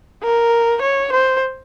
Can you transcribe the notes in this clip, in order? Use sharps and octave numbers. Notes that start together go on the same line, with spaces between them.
A#4
C#5
C5